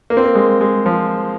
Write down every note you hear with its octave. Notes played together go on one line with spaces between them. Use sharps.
A#3
C4
A#3
G#3
G#3
F3